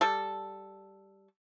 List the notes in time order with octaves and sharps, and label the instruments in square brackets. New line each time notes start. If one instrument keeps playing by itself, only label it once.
[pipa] G3 A4